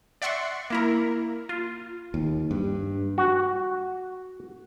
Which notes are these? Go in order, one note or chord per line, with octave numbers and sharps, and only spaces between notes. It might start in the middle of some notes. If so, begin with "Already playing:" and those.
D5 E5 F#5 C6 C#6
A#3 E4 A#4
F4
D#2
G2
F#4